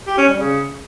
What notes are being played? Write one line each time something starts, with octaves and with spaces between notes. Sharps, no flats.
G4
C#4
G3
C#3